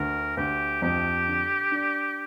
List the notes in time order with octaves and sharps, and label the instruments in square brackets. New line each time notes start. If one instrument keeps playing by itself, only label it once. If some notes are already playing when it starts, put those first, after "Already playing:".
Already playing: [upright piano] D2 [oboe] A#4
[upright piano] D2 [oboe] G4
[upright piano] F2 [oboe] G4
[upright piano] D3
D4